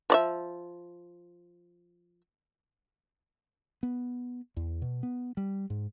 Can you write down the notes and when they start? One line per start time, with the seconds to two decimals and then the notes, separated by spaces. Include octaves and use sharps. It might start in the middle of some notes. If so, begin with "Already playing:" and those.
0.10 F3 D5 E5
3.83 B3
4.57 E2
4.82 B2
5.03 B3
5.37 G3
5.70 G#2